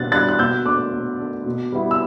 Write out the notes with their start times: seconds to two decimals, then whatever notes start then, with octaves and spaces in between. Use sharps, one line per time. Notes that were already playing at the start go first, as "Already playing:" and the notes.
Already playing: B2 G3 D4 F#6 A6
0.12 G3 D4 F#6 A6
0.29 F#6
0.39 B2 E6 G6
0.65 A3 D4 D6 F#6
0.92 B2
1.19 A3 D4
1.46 B2
1.72 G3 B3 E4
1.91 E6